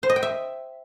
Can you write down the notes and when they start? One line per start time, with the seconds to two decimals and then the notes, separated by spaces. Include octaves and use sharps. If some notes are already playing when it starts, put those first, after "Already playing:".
0.03 C5
0.09 D#5
0.16 G5
0.23 E5